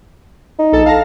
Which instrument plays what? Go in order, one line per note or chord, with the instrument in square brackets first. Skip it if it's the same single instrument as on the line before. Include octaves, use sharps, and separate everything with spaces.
[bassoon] D#4
[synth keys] A#1 A4 A5
F5 A5 A#6